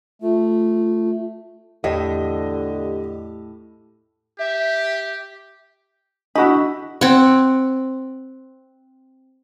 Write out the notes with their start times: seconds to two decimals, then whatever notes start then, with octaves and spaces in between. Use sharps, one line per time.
0.22 A3 F4
1.84 E2 A2 D3 G4 D#5
4.39 G4 E5
6.35 D4 E4 F#4 D#5 F#5 B5
7.01 C4 F#5